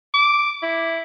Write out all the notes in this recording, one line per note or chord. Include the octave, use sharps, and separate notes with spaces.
D6
E4